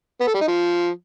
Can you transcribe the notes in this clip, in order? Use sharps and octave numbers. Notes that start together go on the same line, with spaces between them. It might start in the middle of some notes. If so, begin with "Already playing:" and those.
B3
A4
G3
D#4
F3